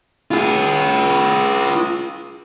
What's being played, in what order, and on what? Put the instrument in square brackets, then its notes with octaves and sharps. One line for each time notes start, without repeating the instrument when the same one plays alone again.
[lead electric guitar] F4 G#4